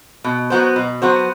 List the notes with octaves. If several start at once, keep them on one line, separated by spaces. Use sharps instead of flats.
B2
F#3 B3 F#4 C5
B2
F#3 B3 F#4 C5